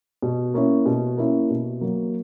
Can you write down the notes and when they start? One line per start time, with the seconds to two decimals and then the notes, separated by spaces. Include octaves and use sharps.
0.22 B2
0.54 A#3 C#4 E4
0.86 B2
1.17 A#3 C#4 E4
1.50 B2
1.81 F#3 A#3